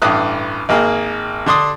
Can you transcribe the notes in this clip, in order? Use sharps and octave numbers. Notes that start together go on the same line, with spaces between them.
A1 G2 D#6 F#6
G#1 A#3 G#4
D3 D4 C6 D#6